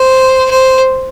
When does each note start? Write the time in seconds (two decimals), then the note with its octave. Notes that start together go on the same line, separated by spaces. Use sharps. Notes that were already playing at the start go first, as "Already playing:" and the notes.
Already playing: C5
0.50 C5